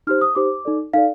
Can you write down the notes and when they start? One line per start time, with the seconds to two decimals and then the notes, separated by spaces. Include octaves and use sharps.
0.07 D#4 G4 C5 F6
0.21 D#6
0.35 D#4 G4 C5 D6
0.65 D#4 A4 D5
0.94 D#4 A4 D5 F5